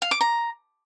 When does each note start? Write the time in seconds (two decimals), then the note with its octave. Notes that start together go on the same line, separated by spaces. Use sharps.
0.02 F5
0.11 D6
0.21 A#5